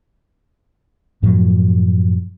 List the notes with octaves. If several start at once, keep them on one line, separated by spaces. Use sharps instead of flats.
F#2 A2 F3 F#3